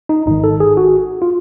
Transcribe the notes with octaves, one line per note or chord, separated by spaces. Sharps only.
D#4
G#1 G#2 D#3 D#4
A4
G#4
F#4
F4